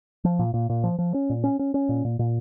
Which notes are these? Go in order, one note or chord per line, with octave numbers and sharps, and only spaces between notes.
F3
A#2
A#2
A#2
F3
F3
C#4
A#2
C#4
C#4
C#4
A#2
A#2
A#2